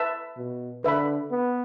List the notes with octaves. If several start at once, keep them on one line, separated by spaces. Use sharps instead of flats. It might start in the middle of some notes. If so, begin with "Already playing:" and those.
Already playing: B4 E5 A5
B2
D3 B4 E5 B5
B3